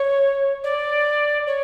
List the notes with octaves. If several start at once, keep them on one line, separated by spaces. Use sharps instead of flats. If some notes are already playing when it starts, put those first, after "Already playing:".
Already playing: C#5
D5
C#5